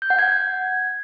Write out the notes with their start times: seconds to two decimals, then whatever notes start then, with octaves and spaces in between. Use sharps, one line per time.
0.02 G6
0.10 F#5
0.19 G#6